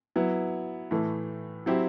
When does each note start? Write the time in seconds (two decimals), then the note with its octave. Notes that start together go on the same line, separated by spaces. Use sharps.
0.16 F#3 B3 E4
0.91 A2 E3 A3
1.66 F#3 C4 E4 G4